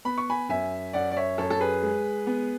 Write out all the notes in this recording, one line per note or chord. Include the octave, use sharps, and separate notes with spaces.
B3 B5
C#6
G#5 B5
F#2 E5 G#5
F#2 D5 F#5
D5
C#5 E5
F#2 A4 C#5
A4
G#4 B4
G#3
B3